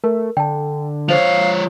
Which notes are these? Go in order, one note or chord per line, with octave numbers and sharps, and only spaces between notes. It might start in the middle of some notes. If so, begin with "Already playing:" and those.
A3 A#4
D3 G5 A5
F3 C5 C#5 F5 F7